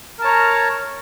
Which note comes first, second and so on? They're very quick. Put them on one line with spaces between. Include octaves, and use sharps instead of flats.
A#4 A5 C#5 A#5